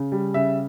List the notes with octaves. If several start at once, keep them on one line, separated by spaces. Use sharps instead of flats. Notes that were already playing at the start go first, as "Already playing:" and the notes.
Already playing: C#3
G3
C#3 E5